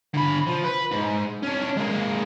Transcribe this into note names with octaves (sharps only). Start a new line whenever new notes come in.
D3 B5
F3
B4
G#2
C#4 D4
G#3 A#3